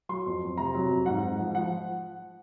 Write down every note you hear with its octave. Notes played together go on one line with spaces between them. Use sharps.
F#3 C6
F2
F2
C3 A#5
F#3
F2
G#2 F#5
G#2
F3
F3 F#5